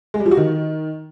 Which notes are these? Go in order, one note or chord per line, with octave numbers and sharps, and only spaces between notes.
G#3
G3
F3
F#4
D#3